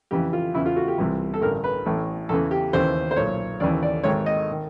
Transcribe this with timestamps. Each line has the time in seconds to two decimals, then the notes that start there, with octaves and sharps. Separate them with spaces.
0.11 F2 C#3 E3 G4
0.33 F4
0.54 E2 C#3 E3 E4
0.66 F4
0.76 F#4
0.88 G4
0.98 C2 C3 E3
1.34 A4
1.42 A1 G2 D3 A#4
1.64 B4
1.86 A1 A2 E3
2.29 E2 C#3 E3 A4
2.51 G4
2.73 D#2 C#3 E3 C5
3.11 C5
3.16 B1 A#2 C#5
3.60 D#2 C#3 E3 D5
3.83 D5
4.04 G#1 G#2 D#3 C#5
4.26 D#5
4.51 D#3